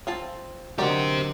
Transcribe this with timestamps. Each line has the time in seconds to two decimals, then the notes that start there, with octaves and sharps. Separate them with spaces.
0.07 C4 F4 A5
0.78 D3 F#3 D#4 F#4 G4 A#4 C5 D5